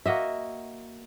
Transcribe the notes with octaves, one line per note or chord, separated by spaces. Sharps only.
A#3 F#4 D#5 E5